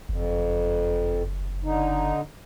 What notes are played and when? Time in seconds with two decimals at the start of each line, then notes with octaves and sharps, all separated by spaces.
0.09 F#1 F2
1.64 D3 D#4